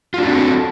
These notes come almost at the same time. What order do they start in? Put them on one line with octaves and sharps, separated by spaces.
F4 D4 F#4 C4 A4